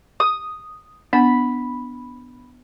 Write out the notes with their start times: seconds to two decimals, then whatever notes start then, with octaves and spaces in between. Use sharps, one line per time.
0.20 D#6
1.13 B3 D4 F#5 B5